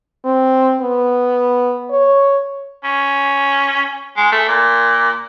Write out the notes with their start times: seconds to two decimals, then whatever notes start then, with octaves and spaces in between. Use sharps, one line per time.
0.25 C4
0.80 B3
1.91 C#5
2.84 C#4
4.17 G#3
4.32 A3
4.48 A#2